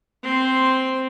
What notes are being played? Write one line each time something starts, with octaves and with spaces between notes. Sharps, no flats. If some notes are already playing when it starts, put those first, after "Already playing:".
C4 C6